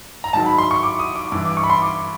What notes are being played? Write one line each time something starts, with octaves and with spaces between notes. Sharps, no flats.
A#5
G#2 D#3 F#3 A5
B5
C6
C#6
D6
D#6
D6
G2 E3 D6
D6
C#6
B5
C6
D6